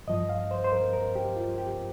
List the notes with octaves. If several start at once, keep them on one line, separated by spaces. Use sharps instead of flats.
G2 F3 D#5
F5
C5
C5
A#4
A#4
G4
F4
G4